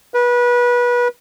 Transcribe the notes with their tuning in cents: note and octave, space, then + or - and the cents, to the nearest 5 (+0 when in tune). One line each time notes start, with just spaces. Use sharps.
B4 -25